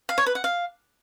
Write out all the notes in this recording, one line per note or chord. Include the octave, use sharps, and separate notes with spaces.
F5
C#5
B4
F#5
F5